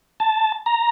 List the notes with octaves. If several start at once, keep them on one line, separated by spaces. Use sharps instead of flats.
A5
A#5